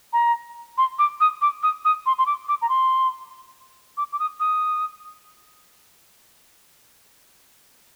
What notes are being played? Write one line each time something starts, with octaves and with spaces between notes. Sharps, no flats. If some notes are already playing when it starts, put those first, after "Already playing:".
A#5
C6
D6
D#6
D6
D#6
D#6
C6
C6
D6
D6
A#5
C6
D6
D6
D#6
D#6